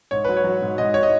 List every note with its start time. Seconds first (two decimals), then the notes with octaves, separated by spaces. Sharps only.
0.11 G#2 C#5
0.25 F#3 B4
0.37 C#5
0.44 F#3
0.62 G#2
0.78 G#2 D#5
0.94 C#5
1.03 D#5